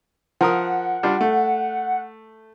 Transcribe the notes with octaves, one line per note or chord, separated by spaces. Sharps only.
F3 A#4 F#5 D#6
G3 D4 F4
A3